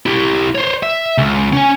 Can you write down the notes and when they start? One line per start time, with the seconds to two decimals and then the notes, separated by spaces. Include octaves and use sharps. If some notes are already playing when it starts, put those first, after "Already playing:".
0.06 E4 G4
0.55 C5 C#5
0.83 E5
1.18 C#2
1.53 C#4 G#5